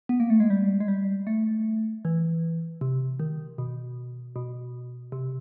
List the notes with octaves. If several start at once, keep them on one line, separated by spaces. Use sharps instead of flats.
B3
A#3
A3
G#3
G3
G#3
G3
A3
E3
C3
D#3
B2
B2
C3